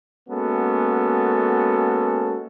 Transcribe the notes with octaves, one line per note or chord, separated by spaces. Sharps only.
G#3 A#3 B3 C#4 F#4 A4